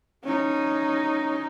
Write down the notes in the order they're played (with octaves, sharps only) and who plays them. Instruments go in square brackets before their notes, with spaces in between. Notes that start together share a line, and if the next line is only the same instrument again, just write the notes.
[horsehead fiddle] C#4 D#4